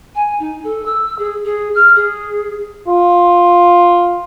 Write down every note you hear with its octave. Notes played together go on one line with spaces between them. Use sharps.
G#5
D#4
A4
E6
G#4
G#4
F6
G#4
F4